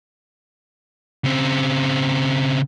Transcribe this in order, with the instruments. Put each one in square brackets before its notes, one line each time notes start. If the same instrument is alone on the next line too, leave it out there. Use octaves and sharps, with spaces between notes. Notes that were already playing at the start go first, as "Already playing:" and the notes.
[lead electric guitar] C#3 C4